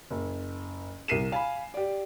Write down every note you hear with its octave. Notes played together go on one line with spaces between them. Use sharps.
F#1
C2 A#4 C7 D#7 E7
F5 G#5 B5
G4 D5